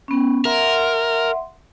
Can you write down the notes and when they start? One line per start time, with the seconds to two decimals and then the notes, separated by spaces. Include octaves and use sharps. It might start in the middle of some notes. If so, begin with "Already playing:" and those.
0.08 B3 C#4
0.45 A#4 E5 F#5 C6